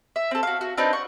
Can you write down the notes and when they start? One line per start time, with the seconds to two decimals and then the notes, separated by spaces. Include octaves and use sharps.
0.16 E5
0.31 C4 A4
0.43 F#4 F5
0.61 F#4
0.78 C4 D4 D#4 B4
0.93 F#5 C#6